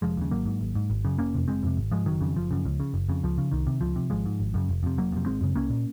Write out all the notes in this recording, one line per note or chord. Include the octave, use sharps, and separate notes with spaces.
F1 F3 G#3
D#2 C#3
G#1 F#3 A#3
G#2
G#1
G#2
G#1
F#2 C#3
F1 A#3 C#4
F2 C3
F#1 G#3 C4
F2 C3
G#1
G#2 F3 G#3
F#1 D#3 F#3
F2 C#3
F#1 F3
F#2 C#3
C#2
C#3
F#1
F2 C#3
C#2 F3
C#3
C2 D#3
C3
C#2 F3
C3
G#1 F3 G#3
G#2
G#1
F#2 C#3
F1
F2 C3
F1 F#3 A#3
F2 C3
G#1 G#3 C4
F#2 C#3
C2 A#3 C#4
A#2